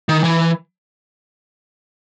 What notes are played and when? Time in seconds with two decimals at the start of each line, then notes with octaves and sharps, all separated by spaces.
0.09 D#3
0.24 E3